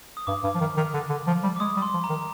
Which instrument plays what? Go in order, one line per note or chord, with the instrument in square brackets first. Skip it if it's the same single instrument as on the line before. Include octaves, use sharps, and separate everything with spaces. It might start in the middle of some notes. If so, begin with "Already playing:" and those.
[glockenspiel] D#6
[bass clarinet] G2 [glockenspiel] D6
[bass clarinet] G2
F3
D#3
D#3
D3
D3
F3
G3
[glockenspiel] D6
[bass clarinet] G#3 [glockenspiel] D#6
[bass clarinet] G3
[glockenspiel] C6
[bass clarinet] F3
[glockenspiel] A#5
[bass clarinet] D#3